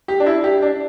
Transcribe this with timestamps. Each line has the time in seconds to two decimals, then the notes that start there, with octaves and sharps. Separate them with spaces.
0.08 G4
0.20 D4
0.26 E4
0.44 G4
0.62 D4